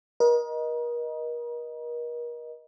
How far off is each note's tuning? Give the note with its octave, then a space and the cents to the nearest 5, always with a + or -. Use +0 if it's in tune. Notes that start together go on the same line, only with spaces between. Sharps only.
A#4 +40 D#5 +0